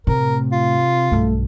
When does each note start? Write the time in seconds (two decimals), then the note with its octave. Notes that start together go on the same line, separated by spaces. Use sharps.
0.07 A2 C3 A#4
0.52 F4
1.11 B1 G2 A3